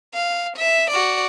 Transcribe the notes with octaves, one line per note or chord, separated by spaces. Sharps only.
F5
E5
F#4 D5